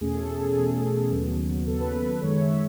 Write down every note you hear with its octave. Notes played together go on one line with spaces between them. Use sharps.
E2 B2 A3 C#4 G#4
A4
A4
G#4
E2 B2 A3 C#4
D#2 C#3 F#3 B3
D#2 C#3 F#3 B3 A4
B4
B4
B4
F#2 D#3 G#3 C#5
E5